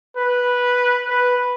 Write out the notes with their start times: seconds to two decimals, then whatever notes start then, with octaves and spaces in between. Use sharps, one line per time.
0.17 B4
1.08 B4